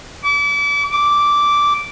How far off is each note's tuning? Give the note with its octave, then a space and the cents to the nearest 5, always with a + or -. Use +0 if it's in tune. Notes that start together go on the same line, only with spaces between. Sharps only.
D6 -35
D6 -5